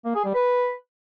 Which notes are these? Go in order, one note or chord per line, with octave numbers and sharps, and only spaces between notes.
A#3
G#4
G3
B4